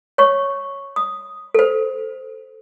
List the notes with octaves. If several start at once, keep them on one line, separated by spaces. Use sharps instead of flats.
C#5 C#6
D#6
A4 C5